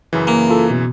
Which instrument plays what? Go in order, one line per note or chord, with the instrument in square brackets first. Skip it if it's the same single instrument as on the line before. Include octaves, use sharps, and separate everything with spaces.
[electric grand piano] F#2 C#3 E3
[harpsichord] A#3
[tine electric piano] F4 A4
B2